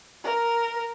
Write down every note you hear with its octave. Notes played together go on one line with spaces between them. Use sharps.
A#4